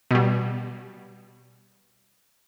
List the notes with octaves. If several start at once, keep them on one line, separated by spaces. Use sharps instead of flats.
B2 G3